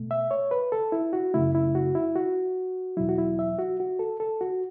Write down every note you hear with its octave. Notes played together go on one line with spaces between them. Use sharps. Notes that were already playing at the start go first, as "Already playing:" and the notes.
Already playing: B2 A3
E5
C#5
B4
A4
E4
F#4
F#2 C#3 A3 E4
E4
F#4
E4
F#4
E2 B2 F#3 E4
F#4
E4
E5
F#4
F#4
A4
A4
F#4